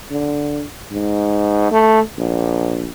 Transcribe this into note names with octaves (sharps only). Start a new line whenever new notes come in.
D3
G#2
A3
A#1